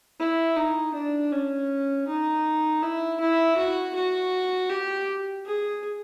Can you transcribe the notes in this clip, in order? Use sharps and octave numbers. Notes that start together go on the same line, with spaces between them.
E4
D#4
D4
C#4
D#4
E4
E4
F#4
F#4
G4
G#4